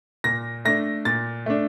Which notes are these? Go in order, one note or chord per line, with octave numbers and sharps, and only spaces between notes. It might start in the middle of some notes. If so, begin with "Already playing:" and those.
A#2 A#6
A3 D4 A#6
A#2 A6
A3 D4